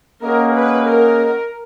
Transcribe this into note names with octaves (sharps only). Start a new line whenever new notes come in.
A#3 C#4 G#4 A#4 D#5 F#5
B4
A#4